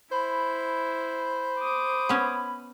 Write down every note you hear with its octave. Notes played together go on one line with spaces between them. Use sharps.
E4 C5 B5
D6 D#6
B3 C#4